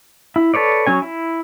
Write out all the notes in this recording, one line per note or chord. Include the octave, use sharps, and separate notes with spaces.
E4
A4 B4 C#5 D5
F#3 C#4 G#5
E4